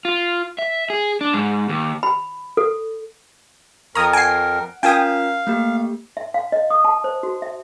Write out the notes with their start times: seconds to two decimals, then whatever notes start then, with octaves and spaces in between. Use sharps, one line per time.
0.05 F4
0.59 E5
0.90 G#4
1.21 D4
1.34 G#2
1.69 D#2
2.03 B5
2.57 A4
3.95 F2 A#4 A#5 C#6 D#6 G#6
4.13 F#5 G#5 C7 D7
4.83 C#4 F4 A#4 F5 G5 G#5 D#6
5.47 A3 A#3 G4
6.17 E5
6.34 F5
6.52 D#5
6.70 D#6
6.84 A5
7.04 C5
7.23 F#4
7.42 E5